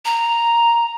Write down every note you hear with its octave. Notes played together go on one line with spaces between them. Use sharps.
A#5